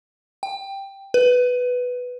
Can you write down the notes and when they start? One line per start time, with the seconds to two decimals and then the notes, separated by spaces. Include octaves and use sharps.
0.43 G5
1.14 B4